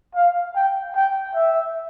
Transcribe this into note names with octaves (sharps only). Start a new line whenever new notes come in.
F5
G5
G5
E5